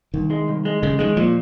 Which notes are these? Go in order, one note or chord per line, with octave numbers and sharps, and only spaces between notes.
C2 D#3
G#3
C2
G#3
C#3 G#3
D#3 G#3
A#2 F3